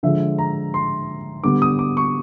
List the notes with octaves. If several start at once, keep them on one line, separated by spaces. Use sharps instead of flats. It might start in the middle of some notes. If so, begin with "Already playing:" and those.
D3 F3 G#3 E5
A#5
C6
D3 G3 B3 D6
D#6
D6
C#6